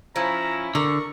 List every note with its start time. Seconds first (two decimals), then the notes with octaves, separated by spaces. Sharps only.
0.16 F3 C#4 E4 A#5
0.75 D3 A#4 C#6